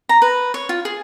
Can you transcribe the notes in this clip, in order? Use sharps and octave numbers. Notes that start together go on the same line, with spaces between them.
A#5
B4
C#5
F4
G#4